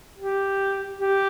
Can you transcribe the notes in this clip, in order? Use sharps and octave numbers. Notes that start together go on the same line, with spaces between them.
G4
G4